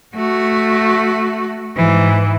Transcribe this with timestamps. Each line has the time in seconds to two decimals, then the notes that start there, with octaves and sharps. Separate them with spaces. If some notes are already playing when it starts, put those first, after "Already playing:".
0.15 A3 F#4
1.76 G#2 E3